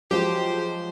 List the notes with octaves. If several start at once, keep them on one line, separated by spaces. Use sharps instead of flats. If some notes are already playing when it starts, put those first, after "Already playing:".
F3 F#3 G#3 G4 C5